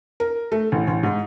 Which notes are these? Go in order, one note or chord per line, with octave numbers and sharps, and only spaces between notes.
A#4
A3
A1
A1
G#2